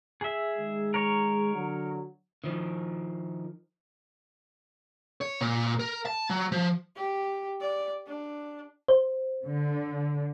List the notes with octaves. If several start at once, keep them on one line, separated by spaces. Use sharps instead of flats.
G#4 E5
D#3 G#3
A#4 C#5
D3 F#3
D#3 F3
C#5
A#2
A#4
A5
F#3
F3
G4
D5
D4
C5
D3